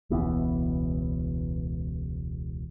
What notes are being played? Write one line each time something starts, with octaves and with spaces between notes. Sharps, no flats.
E1 C#2 E3 B3